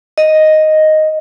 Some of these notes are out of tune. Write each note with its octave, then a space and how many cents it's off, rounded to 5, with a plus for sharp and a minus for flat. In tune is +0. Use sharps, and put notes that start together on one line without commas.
D#5 +0